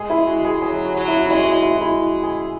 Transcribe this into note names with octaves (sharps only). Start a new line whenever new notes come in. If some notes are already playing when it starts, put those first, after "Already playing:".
Already playing: G#3 G#4
E4
F#4
G#4
F#3 G#4
F#4
F#3
E4
F#4
E4
G#3 F#4
E4
F#4
E4
F#4
E4
F#4
G#4